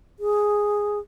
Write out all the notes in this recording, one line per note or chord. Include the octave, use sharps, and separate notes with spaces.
G#4